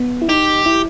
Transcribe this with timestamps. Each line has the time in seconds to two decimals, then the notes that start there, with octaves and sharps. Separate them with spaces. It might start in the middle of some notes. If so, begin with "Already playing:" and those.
Already playing: B3
0.22 E4
0.28 D#4 G4
0.66 E4